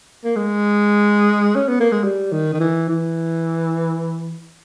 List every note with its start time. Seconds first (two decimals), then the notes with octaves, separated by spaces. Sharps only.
0.25 A#3
0.36 G#3
1.56 C#4
1.68 B3
1.81 A#3
1.92 G#3
2.04 G3
2.32 D#3
2.53 D#3
2.60 E3
2.89 E3